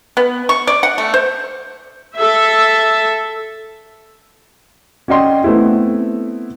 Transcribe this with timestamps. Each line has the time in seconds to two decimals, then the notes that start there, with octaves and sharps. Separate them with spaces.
0.17 B3
0.49 C#6
0.67 D5
0.83 F#5
0.98 A3
1.14 C5
2.18 A4 E5
5.08 C#4 F#4 D5 D#5 G5 C6
5.44 A3 B3 C4 E4